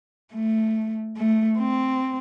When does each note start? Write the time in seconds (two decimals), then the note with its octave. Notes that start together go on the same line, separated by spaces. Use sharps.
0.33 A3
1.17 A3
1.59 C4